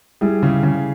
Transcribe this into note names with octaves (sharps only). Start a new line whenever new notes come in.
G3 E4 G#4
C#3
C#3